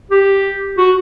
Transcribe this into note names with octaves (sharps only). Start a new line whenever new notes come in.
G4
F#4